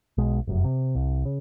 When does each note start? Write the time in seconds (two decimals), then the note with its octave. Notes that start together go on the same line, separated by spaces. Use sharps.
0.18 B1 B2 G#3
0.47 F1 F#2
0.64 C3
0.95 C2
1.25 C#3